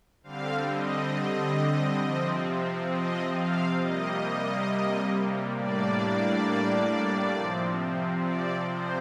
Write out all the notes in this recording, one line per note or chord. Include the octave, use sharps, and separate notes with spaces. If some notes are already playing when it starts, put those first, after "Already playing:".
D3 G3 C4 F5
D#5
C3 F3 C4
D#5
F5
C3 G3 A#3 D#5
A2 G3 A#3 D4 D5
C3 F3 C4
D5
C5